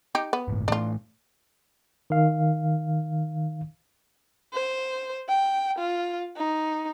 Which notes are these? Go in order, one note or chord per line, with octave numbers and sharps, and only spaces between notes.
D#4 G4
B3
G1 A2
A2 E3 A3 D4 F4
D#3 F5
C5
G5
F4
D#4